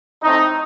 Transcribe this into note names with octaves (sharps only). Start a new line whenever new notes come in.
A2 A3 C4 D#4